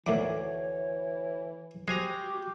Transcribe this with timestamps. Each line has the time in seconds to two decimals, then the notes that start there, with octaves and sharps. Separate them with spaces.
0.06 D2 A2 D#3 E3 C#5 D6
1.88 G#3 F#4 G4 C5 G#5 A#5